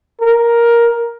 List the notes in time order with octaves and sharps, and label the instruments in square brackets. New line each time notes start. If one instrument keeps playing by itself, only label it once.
[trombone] A#4